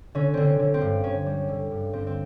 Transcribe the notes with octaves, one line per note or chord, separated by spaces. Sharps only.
D3 C#4
D3 C4
C#4
D3
C4
G2
G2 C#4
G3
D3
G2
G2 C4
C4